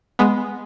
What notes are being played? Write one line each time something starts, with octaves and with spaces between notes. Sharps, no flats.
G#3 B3